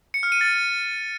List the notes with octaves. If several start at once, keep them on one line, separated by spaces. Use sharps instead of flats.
C#7
F6
D#7
A6